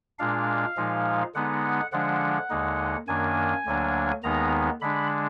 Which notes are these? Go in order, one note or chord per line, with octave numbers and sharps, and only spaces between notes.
A#2 G#3 D4 F5
A#2 F3 G#3 D#4
D3 G#3 B3 D#4 F#5
D3 F3 G#3 D4 F#5
D#2 D3 G#3 D#4
F#2 D#3 A#3 D4 G#5
D2 D3 F#3 A#3 D4
D#2 D#3 G#3 B3 D#4 A#5
D3 G#3 D4 B5